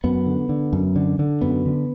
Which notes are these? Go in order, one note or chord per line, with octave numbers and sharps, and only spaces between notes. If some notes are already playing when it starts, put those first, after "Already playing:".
F#2 B3
D3
D3
F#2
D3
D3
F#2 B3
D3